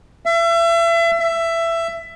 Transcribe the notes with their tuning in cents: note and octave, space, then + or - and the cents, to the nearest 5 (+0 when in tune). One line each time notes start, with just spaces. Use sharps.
E5 +35
E5 +15